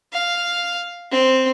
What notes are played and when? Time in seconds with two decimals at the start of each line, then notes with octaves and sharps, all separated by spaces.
0.13 F5
1.11 C4